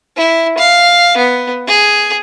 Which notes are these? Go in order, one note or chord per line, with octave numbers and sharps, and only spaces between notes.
E4
F5
B3
G#4